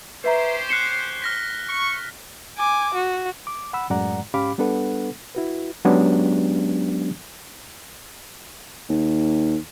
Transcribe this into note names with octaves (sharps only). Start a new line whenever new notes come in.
C#4 G4 B4 C5 E5 A#5
F#6 C7 C#7 E7 G7
F6 A#6 B6
C#6
G#5 D6
F#4
D6
F#5 B5 E6
F#2 A2 G#3 D5 F#5 A#5
G#2 C#4 G4 F5 B5 D6
G3 B3 D4 A4 B4 F#5
E4 F#4 B4
F#3 G#3 B3 C#4 D4 G4
D#2